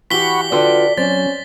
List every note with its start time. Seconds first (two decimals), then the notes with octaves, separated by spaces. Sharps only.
0.11 E3 F#4 G4 F#5 B5 C#6 B6 G7
0.52 D3 F4 F#4 B4 D5 G5 C6
0.98 F#3 C4 C#4 C5 D5 A6